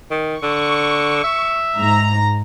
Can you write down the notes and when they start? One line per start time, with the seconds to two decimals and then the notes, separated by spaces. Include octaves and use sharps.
0.11 D#3
0.43 D3 C#6
1.24 E5
1.78 G#2 A#5